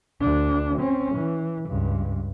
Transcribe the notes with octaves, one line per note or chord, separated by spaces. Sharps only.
D2 D4
C4 C#4
E3
C#2 G2